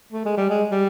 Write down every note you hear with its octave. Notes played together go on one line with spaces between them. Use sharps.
A3
G#3
G3
G#3
G3